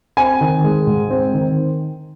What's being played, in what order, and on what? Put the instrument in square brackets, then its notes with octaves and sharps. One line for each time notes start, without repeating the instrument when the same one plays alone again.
[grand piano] C4 G#5
D#3
G#3
G#2
C4
D#3